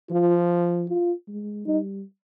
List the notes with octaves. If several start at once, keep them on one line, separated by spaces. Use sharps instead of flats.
F3 F4
F4
G#3
G3 D#4